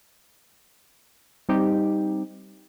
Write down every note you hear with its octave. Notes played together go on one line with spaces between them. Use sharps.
G3 C4 D#4 G4